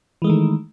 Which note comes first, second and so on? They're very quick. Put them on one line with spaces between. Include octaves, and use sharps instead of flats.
E3 G#3 A3 D#3